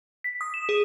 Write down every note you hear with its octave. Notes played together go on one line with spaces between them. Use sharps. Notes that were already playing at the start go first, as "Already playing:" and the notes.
B6
D#6
E7
G#4